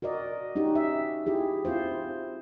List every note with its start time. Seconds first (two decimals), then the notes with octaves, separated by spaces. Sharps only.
0.02 F#4 A#4 D5 D#5
0.55 C#4 D#4 F#4 G4
0.75 E5
1.26 E4 F4 G4 G#4
1.65 C4 E4 F4 C5